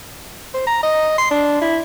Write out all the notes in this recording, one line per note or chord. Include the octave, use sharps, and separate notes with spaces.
C5
A#5
D#5
C6
D4
E4